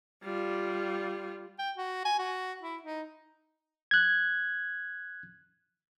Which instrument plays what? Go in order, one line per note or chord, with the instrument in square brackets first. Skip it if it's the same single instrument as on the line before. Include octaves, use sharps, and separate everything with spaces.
[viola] G3 F4
[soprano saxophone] G5
F#4
G#5
F#4
E4
D#4
[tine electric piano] F#6 G#6